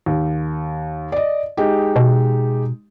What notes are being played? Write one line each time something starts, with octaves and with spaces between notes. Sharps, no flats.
D#2
D5 D#5
G#3 D#4 G4
B2